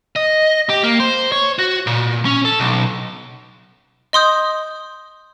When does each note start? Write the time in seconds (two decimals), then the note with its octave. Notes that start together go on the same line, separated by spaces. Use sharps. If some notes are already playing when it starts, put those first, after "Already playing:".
0.16 D#5
0.69 G4
0.84 A#3
1.00 C5
1.32 C#5
1.59 F#4
1.87 A#2
2.25 C#4
2.45 A4
2.60 B1
4.13 D#5 C6 D#6 G6